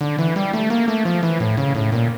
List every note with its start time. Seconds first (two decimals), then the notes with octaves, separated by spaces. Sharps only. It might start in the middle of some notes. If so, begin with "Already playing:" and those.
0.01 D3
0.19 E3
0.36 G3
0.53 A3
0.70 A#3
0.88 A3
1.05 F3
1.23 E3
1.40 A2
1.57 C#3
1.75 A2
1.92 A#2